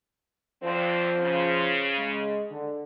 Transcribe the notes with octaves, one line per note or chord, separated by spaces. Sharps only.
F2 D3 F3 C4 C5
C#3
G#3
D3